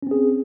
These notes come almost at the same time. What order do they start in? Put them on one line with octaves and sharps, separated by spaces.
C#4 C4 G#4